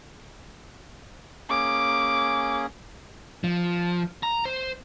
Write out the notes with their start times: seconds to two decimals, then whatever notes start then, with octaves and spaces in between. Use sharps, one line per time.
1.50 A#3 C#4 G#4 D6
3.44 F3
4.23 A#5
4.45 C5